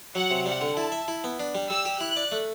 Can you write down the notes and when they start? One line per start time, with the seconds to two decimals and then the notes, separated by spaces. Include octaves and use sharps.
0.15 F#3 F#5
0.31 C3
0.46 G3 F#5
0.61 D3
0.77 E4 A5
0.92 E5
1.08 E4
1.24 B3
1.40 D4
1.55 G3
1.70 G3 E6
1.85 G4
2.00 E4 F#6
2.17 D5
2.32 A3